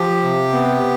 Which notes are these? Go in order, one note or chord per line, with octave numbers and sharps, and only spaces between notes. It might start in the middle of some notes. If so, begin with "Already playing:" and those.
Already playing: F3 G4
C3
B3